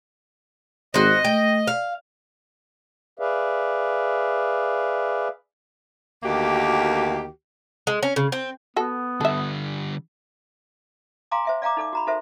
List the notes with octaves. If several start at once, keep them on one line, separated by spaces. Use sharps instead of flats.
G#1 C4 F#4 D#5
A3 G5
F5
G#4 B4 D5 E5 F5
D2 D#3 A#3 F#4 G4
G#3
C#4
C#3
C4
B3 F#4 A4
D3 G3 A4 E5
F5 G#5 A#5 C6 D6
C5 E5 G5
D5 F5 G5 A#5 D6
D#4 A4 D5 D6
F#4 A#5 B5
D#4 F#4 A4 A#4 C5 E5